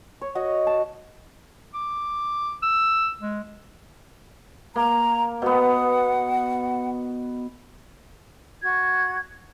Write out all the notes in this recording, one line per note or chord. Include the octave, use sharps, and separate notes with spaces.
C#5
F#4 D#5 F#5
A5
D6
E6
G#3
A#3 A#5
B2 B3 F#5
F#4 G#6